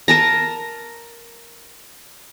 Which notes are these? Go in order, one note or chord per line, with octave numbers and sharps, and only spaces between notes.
A#4 A5 A#5